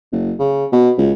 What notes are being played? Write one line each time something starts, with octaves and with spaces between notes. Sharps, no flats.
F#1
C#3
B2
C#2